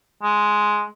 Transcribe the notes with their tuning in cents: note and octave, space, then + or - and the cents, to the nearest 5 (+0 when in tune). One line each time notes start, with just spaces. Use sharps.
G#3 +5